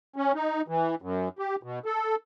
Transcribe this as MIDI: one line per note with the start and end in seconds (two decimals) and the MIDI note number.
0.16 0.32 61
0.35 0.61 63
0.68 0.95 52
1.02 1.28 42
1.39 1.56 67
1.63 1.79 47
1.86 2.15 69